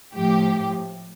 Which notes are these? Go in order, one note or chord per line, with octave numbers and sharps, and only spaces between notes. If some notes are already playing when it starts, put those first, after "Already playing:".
A2 F3 G4